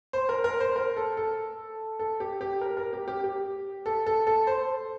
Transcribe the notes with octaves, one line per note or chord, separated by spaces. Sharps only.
C5
A#4
A#4
C5
A#4
A4
A4
A4
G4
G4
A#4
A#4
G4
G4
G4
A4
A4
A4
C5